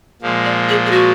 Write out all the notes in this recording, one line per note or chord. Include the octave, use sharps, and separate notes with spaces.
A#2 F3 G#3
D5
G#4
G#4
F#4